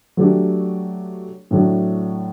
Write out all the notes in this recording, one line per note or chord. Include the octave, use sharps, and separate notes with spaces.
F#3 A3 D4 G4
A2 F#3 A3 D4